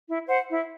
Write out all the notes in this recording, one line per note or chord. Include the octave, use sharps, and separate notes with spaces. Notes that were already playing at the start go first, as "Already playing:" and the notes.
E4
C5 F#5
E4